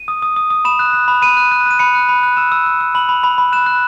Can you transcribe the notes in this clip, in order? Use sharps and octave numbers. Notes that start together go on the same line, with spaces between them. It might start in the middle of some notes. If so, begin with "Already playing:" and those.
Already playing: D#7
D#6
D#6
D#6
D#6
B5 E7
F#6
F#6
B5
B5 D#7
F#6
F#6
F#6 D#7
B5 C#7
F#6
B5
F#6
E6 E7
E6
E6
E6
B5 F#7
B5
B5
B5
F#6 E7
F#6